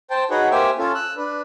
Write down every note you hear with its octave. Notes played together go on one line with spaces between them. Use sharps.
C5 G5 A5
D#4 F#4 G#4 B4 C#5 F#5
A#3 G4 C5 E5 G5 G#5
C#4 F4 A4
E6 F#6
D4 B4